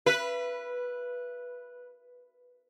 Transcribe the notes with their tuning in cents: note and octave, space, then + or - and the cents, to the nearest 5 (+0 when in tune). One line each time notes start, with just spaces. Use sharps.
B4 -10 E5 +40